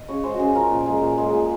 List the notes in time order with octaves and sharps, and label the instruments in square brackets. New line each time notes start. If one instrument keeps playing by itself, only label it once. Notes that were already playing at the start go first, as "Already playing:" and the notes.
Already playing: [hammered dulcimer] D#5
C#3 C#5
G#3 C5
F#4
C#3 G#4
F3 A#4
A#2
G#3
A#2
G#3
A#2